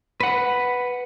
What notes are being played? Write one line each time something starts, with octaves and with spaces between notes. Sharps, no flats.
B4 F#5